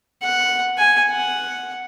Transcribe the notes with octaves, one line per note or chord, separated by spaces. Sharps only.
F#5
G#5
F#5